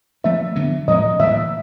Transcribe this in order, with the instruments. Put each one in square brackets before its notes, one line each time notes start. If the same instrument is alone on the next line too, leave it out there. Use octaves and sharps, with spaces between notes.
[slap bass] F3 A3 C#4 [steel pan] E5
[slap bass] D3 F#3 B3
[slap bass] A2 F3 G#3 C#4 [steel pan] D#5
[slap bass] A2 E3 G3 A#3 [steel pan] E5